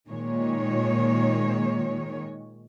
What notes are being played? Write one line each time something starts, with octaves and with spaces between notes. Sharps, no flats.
A#2 D#3 G#3 C#5